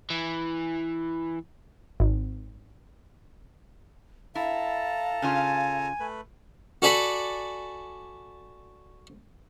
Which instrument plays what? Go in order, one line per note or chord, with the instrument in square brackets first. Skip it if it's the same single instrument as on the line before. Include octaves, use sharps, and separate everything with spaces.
[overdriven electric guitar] E3
[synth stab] G#1
[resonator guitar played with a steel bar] E4 [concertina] A4 A5 A#5 [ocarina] F5
[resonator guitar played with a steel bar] C#3 C#4 F4 [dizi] G#5
[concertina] A3 B4
[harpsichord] F#4 A4 D5 G#5 B5